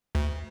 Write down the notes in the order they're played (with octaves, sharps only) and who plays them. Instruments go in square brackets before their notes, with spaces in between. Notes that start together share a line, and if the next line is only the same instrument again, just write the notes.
[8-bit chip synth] D2